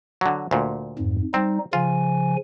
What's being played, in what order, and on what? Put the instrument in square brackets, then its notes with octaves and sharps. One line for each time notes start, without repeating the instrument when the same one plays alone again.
[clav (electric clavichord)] D3 F#3
D2 A#2
[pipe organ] F2 G#2
[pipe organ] G3 D#4 [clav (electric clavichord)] C4
[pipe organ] C#3 F3 G#5 [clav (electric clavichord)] F4